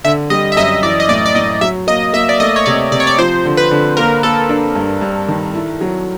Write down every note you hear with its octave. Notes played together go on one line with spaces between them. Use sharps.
D3 E5
G3 D#5
E5
F#2 D#5
E3 D5
D#5
A2 D5
D5
A2 D#5
F#3 E5
A#3 D#5
A#3 E5
D5
A3 D#5
C#5
C3 D5
C3 D5
C#5
D5
F3 C5
D3
B4
D3
A#3 A#4
A#3 A4
D4
G2
G2
D#3
E4
F#3